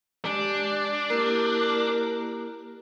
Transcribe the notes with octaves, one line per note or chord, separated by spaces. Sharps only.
G#3 D4 G4
A#3 E4 G4 A#4